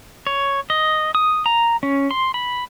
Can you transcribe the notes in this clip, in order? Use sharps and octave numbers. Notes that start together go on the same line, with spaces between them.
C#5
D#5
D#6
A#5
C#4
C6
B5